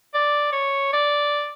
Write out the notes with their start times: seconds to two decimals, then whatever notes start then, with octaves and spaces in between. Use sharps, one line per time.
0.14 D5
0.52 C#5
0.93 D5